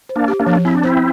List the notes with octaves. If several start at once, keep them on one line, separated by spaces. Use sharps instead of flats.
C5
A#3 D4
G4
A#3 D4
F3
C4 E4
D4
C4 E4 C5